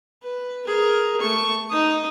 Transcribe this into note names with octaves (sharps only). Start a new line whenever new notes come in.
B4
G#4 A#4
A3 C#6
D#4 D#6